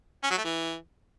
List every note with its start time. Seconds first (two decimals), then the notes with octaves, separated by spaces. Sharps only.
0.23 C#4
0.30 F#3
0.38 A3
0.45 E3